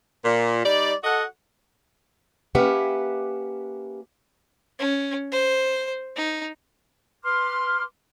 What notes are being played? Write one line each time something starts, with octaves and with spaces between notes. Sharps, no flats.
A#2
G3 D#4 D5
F#4 A4 D#5 F#5
A#3 C#4 G4 B4 E5 F#5
C#4
C5
D#4
B4 C6 D6 F6